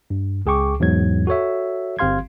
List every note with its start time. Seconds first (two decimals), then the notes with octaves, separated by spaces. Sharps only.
0.10 G2
0.46 C#2 G#4 G5 C#6 D6
0.80 E2 G#2 F#3 G#6
1.27 F#4 A4 C#5 E5
1.99 G1 C4 G4 F5 C6 G#6